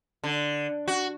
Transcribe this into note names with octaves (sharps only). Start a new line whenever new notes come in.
D3
F#4